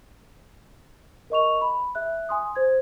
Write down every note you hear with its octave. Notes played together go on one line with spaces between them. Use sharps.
A#4 D#5 C#6 F7
B5
E5 F#6
G#5 C6 D#6
C5 G#6